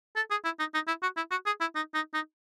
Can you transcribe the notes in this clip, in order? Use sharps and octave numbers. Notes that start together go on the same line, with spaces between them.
A4
G#4
E4
D#4
D#4
E4
F#4
E4
F#4
G#4
E4
D#4
D#4
D#4